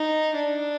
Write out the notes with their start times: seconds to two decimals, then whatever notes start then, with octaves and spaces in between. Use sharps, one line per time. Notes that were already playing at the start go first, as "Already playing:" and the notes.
Already playing: D#4
0.35 D4